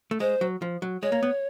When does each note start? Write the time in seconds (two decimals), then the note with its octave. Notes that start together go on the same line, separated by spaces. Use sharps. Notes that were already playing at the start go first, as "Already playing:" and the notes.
0.11 A3
0.20 G#3 C5
0.41 F#3
0.62 F3
0.82 F#3
1.03 G#3 C#5
1.12 A#3
1.23 B3